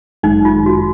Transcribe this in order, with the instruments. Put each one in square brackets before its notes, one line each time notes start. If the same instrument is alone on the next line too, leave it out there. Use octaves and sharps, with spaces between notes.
[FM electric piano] G1 F#2 D#3 G#3 [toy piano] D#4
[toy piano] F4
F#4